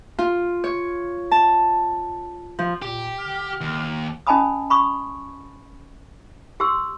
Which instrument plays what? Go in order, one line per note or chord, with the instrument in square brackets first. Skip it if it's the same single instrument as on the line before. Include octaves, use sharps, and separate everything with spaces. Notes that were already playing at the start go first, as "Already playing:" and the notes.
[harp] F4
C#5
A5
F3
[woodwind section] A#2 [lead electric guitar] G4
[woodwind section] D3 F6
[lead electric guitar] D#2
[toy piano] C#4 D#5 G#5 A5 B5 D#6
B5 C#6 D#6
G4 C6 E6